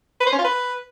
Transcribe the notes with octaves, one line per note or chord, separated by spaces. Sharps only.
B4
C5
C#4
F4
B4